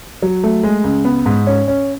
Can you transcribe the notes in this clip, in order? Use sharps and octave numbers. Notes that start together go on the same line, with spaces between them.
F#3
A3
G#3
C#2
B3
G#2
C#4
C#4